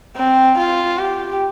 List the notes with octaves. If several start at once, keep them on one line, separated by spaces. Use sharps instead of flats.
C4
F4
G4